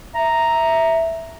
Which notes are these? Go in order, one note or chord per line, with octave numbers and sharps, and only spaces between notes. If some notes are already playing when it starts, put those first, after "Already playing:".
E5 A#5